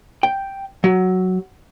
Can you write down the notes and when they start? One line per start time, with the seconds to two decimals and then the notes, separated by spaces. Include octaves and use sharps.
0.23 G5
0.84 F#3